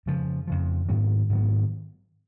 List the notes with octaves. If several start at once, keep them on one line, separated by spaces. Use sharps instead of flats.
F2 C#3 F3
F2 C#3 F3
G#2 D#3 F#3 B3
G#2 D#3 F#3 B3